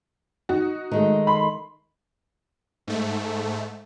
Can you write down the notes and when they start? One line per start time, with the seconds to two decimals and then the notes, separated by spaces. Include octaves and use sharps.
0.49 D#4 F#4
0.92 D#3 G#3 A3
1.27 B5 C6
2.87 G#2 A3